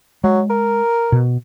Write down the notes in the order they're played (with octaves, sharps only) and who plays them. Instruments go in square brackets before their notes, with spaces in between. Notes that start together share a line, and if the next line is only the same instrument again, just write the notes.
[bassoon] F#3 [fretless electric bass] G#3
[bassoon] A#4
[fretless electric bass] B2